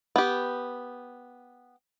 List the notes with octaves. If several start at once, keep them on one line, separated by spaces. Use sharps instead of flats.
B3 G4